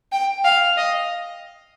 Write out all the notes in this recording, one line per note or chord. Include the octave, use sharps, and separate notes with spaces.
G5
F5
D#5